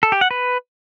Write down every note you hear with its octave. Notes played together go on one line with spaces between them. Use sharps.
A4
G4
F#5
B4